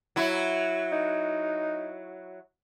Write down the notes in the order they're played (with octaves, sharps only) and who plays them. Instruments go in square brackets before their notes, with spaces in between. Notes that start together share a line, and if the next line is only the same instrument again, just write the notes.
[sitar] F#3 E4
[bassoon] D#4